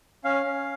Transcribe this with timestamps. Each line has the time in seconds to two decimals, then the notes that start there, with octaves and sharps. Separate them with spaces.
0.24 C#4 F5
0.46 C#4